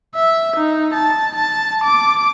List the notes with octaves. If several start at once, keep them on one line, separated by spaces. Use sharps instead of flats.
E5
D#4
A5
A5
D6